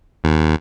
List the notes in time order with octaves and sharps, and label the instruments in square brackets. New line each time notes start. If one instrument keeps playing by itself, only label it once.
[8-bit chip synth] D#2